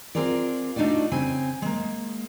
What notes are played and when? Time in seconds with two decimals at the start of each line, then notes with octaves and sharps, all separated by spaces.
0.15 C4 F4 G#4 A#4 D5
0.76 A3 D4 D#4 F4 F#4 D5
1.12 C#3 C4 G#5
1.62 G#3 A#3